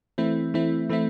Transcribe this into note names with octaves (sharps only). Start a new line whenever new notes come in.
E3 A3 C4 E4
E3 A3 C4 E4
E3 A3 C4 E4